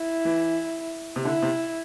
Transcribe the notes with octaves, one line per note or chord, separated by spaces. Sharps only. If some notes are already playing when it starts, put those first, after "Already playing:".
Already playing: E4
E3
C3
D3 E4
C3